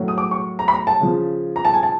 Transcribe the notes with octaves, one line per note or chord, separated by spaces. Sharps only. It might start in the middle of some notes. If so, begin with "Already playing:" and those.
Already playing: A2 F#3
D#6
D6
C#6
A#5
B5
A#5
A5
C#3 F3
A#5
A5
G#5
A5